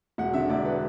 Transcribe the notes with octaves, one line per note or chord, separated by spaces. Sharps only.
E1 F#5
D3 E5
E1 D5
B4